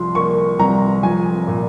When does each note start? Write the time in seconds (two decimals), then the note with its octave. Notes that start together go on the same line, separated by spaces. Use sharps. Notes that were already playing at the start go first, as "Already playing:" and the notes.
Already playing: C2 F3 C6
0.15 A#3 C#6
0.59 C2 A#5
1.03 F3 G#5
1.47 A#2